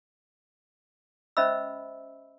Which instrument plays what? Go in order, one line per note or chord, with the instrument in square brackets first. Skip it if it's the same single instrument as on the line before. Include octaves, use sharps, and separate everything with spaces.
[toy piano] C#4 C5 D#5 E5 B5 E6